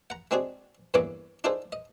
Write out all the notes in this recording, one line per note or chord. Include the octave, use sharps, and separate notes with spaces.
F#5 A#5
G#3 C4 D4 F#4 G#4
E2 G2 E3 A#3 C#5 D6
D4 D#4 F4 G#4 A4 C5
D#5